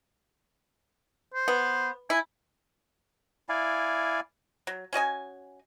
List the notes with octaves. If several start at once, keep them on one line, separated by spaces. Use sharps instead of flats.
C5
B3
E4 G#5
E4 D5 F5 G#5
F#3
C#4 F#4 D#5 G#5